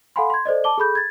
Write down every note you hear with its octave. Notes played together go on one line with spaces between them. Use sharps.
A4 F5 F#5 G#5 B5 C6
C6 G#6
A4 C5 D5 D#5
A5 D6 G7
G#4 A4 B5 G6
G#6 A6